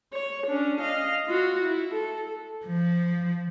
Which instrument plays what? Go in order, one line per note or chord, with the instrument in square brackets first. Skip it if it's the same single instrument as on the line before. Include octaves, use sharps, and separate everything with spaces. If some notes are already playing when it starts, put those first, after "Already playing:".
[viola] C#5
C#4 D4
D#5 F5
F4 F#4
E4
A4
[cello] F3